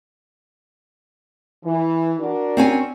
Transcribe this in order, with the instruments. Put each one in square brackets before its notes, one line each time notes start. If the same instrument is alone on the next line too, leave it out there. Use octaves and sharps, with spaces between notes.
[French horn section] E3
D4 F#4 A#4
[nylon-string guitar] C4 C#4 G#5